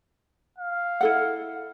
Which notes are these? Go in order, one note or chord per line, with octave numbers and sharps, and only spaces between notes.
F5
E4 A4 F#5